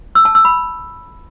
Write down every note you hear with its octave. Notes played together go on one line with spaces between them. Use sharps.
E6
A5
E6
B5